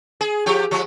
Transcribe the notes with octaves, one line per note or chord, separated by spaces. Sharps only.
G#4
F3 G4
F3 G#3